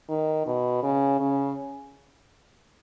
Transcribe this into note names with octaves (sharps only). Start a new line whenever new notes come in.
D#3
B2
C#3
C#3